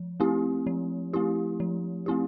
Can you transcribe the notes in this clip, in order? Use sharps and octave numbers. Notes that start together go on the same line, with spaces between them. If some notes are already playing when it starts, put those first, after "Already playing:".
Already playing: F3
A3 C4 E4 G4
F3
A3 C4 E4 G4
F3
A3 C4 E4 G4